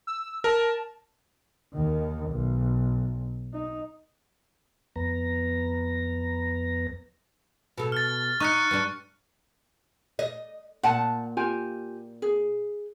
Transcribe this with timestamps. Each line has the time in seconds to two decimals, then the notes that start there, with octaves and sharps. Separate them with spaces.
0.07 E6
0.44 A#4 A5
1.74 D#2 D#3
2.30 B1
3.53 D#4
4.96 F2 B3 A#5
7.78 B2 A4
7.92 F6 A6
8.40 D#4 C#6 F#6 C#7
8.71 G2 D4
10.19 D#5
10.83 A#2 F#5 A5
11.37 F4 G4 G#5
12.22 G#4